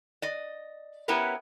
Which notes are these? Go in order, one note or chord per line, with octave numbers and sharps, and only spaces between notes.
D5 D#5
B3 C#4 E4 G4 A#4 B4